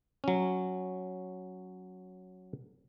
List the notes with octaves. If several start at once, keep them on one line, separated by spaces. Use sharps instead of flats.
F#3 C#4